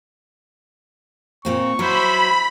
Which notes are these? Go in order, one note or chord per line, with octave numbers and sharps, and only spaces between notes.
A#2 A#3 C4 C#6
F#3 E4 C5 B5